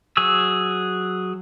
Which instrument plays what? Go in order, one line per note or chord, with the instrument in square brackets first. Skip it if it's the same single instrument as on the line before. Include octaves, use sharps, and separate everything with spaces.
[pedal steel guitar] F#3 G#4 C#6 E6